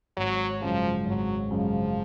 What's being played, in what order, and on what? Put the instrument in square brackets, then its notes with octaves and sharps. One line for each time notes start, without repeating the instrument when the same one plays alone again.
[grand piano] G#1 [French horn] F#3
[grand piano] F#2 C#3 G#3 [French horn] F3
[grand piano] G#1 [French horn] F#3
[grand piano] F#2 C#3 G#3 [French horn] F3